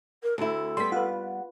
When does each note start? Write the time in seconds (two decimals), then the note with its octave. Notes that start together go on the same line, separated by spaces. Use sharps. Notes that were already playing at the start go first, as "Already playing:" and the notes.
0.23 A#4
0.38 D2 E4 A4
0.77 G3 B3 C6 B6
0.92 F4 B4 F#5